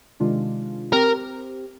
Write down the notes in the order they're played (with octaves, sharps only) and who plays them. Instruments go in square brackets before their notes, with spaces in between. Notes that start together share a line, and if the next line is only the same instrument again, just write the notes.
[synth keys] C3 D#3 G#3 D4 F4
[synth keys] C4 G4 [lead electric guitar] A#4